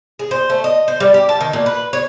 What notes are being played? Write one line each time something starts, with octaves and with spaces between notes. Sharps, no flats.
G#4
C5
A3
D#5
C5
G3
G4
A5
D#3
A#2
B4
C#5